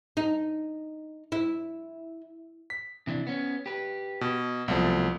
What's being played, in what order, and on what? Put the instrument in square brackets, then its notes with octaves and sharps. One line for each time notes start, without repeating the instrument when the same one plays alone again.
[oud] D#4
E4
[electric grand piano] B6
[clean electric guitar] C3 E3 D4
B3 C#4
G4 B4
[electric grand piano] B2
[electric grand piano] C2 F3 [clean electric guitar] B2 F#3 A3